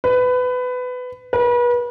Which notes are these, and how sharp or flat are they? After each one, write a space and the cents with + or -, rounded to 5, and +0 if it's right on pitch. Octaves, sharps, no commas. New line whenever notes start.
B4 +20
B4 -35